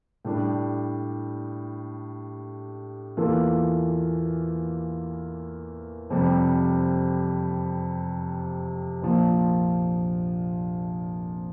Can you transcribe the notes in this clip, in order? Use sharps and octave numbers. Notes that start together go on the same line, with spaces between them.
A2 G3 D4
E2 E3 A#3 F4 A4
F2 C3 G3
A#1 A#2 F3